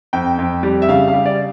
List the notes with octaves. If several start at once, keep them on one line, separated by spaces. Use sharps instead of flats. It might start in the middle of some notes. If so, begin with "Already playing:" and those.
F2 G5
F2
G3
E5
C#3 F5
F5
G3
D5